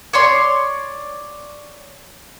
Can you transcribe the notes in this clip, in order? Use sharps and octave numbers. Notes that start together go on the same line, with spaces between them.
C#5 D5 C6